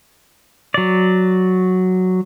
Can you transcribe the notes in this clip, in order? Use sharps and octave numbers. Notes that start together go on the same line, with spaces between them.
F#3 D5